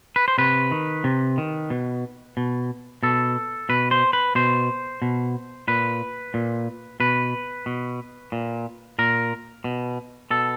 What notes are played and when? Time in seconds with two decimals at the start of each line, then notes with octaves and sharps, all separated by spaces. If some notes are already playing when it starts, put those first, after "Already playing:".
0.16 B4
0.28 C5
0.38 C3 B4
0.71 D#3
1.04 C3
1.38 D#3
1.70 B2
2.37 B2
3.03 B2 A4
3.69 B2 B4
3.91 C5
4.13 B4
4.35 B2 C5
5.02 B2
5.68 A#2 B4
6.34 A#2
7.00 B2 B4
7.66 B2
8.32 A#2
8.99 A#2 A#4
9.64 B2
10.31 B2 A4